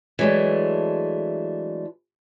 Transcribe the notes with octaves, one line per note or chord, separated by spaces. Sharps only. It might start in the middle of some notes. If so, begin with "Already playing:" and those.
E3 F#3 G#3 A3 D4